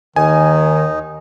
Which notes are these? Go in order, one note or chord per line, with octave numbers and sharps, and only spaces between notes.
D#2 D#3 D#4 G#5